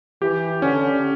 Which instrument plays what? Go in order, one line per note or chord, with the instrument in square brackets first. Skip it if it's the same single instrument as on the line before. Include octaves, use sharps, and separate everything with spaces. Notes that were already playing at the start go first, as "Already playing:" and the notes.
[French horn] E3 [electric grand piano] G4
[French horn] D3 [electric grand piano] C#4